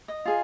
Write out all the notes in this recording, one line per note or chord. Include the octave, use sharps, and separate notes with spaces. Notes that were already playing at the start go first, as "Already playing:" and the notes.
D#5
F4 G#4